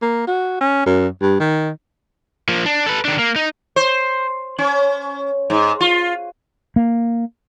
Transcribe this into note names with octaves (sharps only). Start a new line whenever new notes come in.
A#3
F#4
C#4
F#2
G2
D#3
F3 A#3
D4
A4 B4
D#3 D4
A#3
D#4
C5
C#4
G#2
F4
A#3